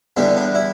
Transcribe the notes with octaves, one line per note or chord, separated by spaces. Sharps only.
E2 D3 G3 B3 D4
D4
E4